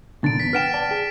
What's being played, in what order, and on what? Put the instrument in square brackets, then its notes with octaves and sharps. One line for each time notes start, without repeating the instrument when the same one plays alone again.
[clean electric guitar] A#2 D3 [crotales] A6 D7
[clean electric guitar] E2 [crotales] B6
[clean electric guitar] B4 F#5 G5 [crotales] F6 D7 E7
[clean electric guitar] D5 G5 A5
G#4